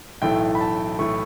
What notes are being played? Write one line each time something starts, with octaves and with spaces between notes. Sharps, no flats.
B1 A2 E3 A3 G5
B5
A5
A2 E3 A3 C#6